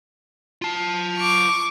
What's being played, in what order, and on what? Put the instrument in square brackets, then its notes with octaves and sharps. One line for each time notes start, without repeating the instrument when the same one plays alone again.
[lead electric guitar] F4 A5
[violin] C#6 D6